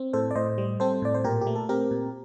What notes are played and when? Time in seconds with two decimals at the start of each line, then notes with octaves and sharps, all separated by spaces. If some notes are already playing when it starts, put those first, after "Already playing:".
Already playing: C4
0.13 A2 A4 C5
0.31 D5
0.36 A2 C5 D#5
0.58 G3
0.80 C4 A4 C5
1.02 A2 D5
1.15 C5
1.24 A#2 G4 A#4
1.41 G4
1.47 A3
1.55 A4
1.69 C4 G4 A#4
1.91 A#2